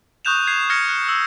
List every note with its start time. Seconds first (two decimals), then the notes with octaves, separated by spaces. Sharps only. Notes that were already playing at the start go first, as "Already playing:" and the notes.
0.25 C#6 D#6 F#6 G6 E7 F7
0.47 G#6 C7
0.70 F6 G#6 A#6 C#7
0.88 F#6
1.08 E6